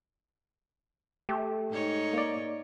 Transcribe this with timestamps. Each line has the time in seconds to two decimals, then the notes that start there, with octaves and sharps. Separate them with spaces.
1.29 A3 G4
1.70 G#2 D#4 C#5
2.13 A#3 D5